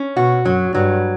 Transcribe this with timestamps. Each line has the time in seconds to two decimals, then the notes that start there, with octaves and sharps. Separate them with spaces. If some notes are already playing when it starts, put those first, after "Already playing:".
Already playing: C#4
0.17 B2 F#4
0.45 F#2 F#3
0.74 G2 F#3